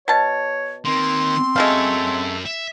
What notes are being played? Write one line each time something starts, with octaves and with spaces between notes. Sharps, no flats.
B2 C#5 A5
D#3 A#3 C4 C6
F#2 G#3 A3 C#5 F5
E5